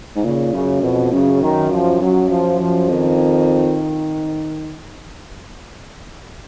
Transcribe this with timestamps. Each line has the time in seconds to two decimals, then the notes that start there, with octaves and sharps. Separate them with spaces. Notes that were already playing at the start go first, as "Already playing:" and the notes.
0.16 G#2
0.24 A#2 C#3
0.53 F#2 C#3
0.82 F2 B2
1.12 F#2 C#3
1.42 D#3
1.71 F3
2.00 F#2 F#3
2.30 F3
2.59 F3
2.88 F2 D#3